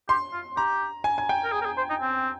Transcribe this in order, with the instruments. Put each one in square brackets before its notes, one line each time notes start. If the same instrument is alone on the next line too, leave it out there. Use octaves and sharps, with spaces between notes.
[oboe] G4 [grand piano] C6
[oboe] F4
[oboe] G4 [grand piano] A#5
[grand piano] G#5
G#5
G5
[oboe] A#4
G#4
A#4
G#4
C5
D#4
C4